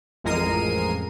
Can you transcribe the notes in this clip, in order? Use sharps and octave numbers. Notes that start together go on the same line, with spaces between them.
A1 F2 G#3 A#4 C7 D#7